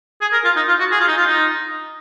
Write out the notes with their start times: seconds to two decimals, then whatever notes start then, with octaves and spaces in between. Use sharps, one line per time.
0.21 G#4
0.32 A#4
0.45 F4
0.56 D#4
0.68 F4
0.79 F#4
0.91 G#4
1.00 F4
1.08 D#4
1.17 F4
1.26 D#4